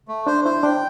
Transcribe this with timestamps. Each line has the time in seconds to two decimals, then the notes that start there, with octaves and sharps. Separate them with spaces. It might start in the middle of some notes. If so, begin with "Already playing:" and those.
0.08 A3
0.27 D4 C5
0.45 E4 C5
0.63 D4 G5